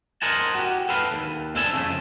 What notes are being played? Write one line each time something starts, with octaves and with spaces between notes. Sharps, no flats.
A#4 C5 D#5 F#5 G#5 A5
F#4 G4
A4 B4 F5
D#2
C4 D4 A4 E5 G#5 A5
F2 C#3 A3